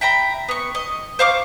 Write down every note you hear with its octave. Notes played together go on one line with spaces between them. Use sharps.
E5 G5 A#5 B5
B3 C#6
D#5
C5 F5 C#6 D6